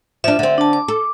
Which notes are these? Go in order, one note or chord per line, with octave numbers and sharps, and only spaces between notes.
F3 D4 E5
D3 C4
D4 A5
D6
A4